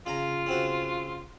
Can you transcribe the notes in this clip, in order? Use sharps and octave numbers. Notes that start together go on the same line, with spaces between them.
C#3 F4 F5 A#5
C#3 C4 F#4